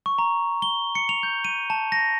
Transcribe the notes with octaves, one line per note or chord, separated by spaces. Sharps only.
C#6
A#5
G7
C#7
F7
G6
D#7
A5
A#6